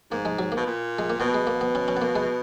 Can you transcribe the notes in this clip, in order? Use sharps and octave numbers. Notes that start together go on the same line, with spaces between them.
G#2 A#3
G#3
F#3
B2 A#3
A#2
G#3
A#3
B2 B3
G#3
A#3
B3
C#4
C#4
B3
A#3
G#3